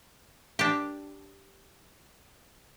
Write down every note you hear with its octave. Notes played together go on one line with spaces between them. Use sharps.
D4 G4